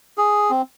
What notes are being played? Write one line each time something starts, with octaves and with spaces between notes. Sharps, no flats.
G#4
C4